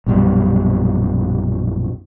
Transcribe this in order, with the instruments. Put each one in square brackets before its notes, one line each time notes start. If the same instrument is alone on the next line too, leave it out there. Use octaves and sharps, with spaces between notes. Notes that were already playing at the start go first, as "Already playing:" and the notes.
[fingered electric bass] A#1 F#2 B2 G3